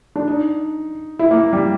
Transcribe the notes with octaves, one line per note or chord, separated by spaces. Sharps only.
D4
D#4
E4
A#3
G3